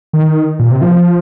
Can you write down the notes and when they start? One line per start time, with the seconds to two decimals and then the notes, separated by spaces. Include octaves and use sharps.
0.13 D#3
0.59 A#2
0.71 C3
0.81 F3